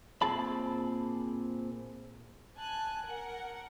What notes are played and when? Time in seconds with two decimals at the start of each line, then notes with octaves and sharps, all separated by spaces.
0.22 A#2 C4 G#4 A5 B5
2.56 G#5 A5 F#6
3.05 A#4 F#5